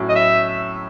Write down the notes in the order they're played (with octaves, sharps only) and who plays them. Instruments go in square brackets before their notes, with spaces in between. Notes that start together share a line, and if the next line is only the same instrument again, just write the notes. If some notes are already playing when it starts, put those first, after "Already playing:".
Already playing: [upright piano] A2 F#3 C#4
[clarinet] D#5
E5